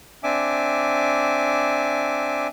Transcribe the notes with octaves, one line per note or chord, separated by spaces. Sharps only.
C4 D4 E5 G#5 D6